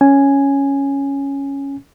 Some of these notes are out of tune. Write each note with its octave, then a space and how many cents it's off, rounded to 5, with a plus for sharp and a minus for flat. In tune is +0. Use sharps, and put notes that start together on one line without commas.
C#4 +0 G#5 +0